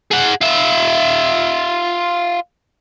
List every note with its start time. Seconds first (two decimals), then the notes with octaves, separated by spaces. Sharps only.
0.11 G#4 F#5
0.41 F4 E5